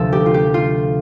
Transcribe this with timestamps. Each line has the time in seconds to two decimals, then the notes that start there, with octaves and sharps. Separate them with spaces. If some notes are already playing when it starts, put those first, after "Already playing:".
Already playing: D2 C3 F3 A4
0.13 G4
0.26 F4
0.34 G4
0.54 F4